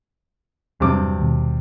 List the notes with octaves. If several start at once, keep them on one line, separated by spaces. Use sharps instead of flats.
E2 G2 C3 F#3 D6
D#2 B2